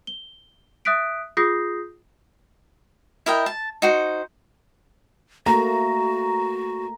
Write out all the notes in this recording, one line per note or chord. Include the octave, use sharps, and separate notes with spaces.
G7
E5 D#6 F#6 B6 D7
F4 G#4 D#6 G6 A#6 C7
E4 A#4 D#5 G5
A5
D#4 F#4 C5
A3 A#3 F#4 A#5